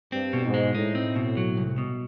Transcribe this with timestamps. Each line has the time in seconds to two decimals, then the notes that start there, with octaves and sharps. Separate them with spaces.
0.12 G2 C4
0.33 B2
0.44 G#2
0.54 G#3
0.74 A2 D#4
0.95 C4
1.16 B2
1.37 F#3
1.57 C2
1.78 B2